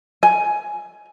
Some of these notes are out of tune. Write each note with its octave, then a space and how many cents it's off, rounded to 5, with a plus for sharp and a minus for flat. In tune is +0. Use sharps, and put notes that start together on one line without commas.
G#5 +10